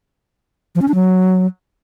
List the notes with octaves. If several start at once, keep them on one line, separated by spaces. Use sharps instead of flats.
F3
C#4
D4
F#3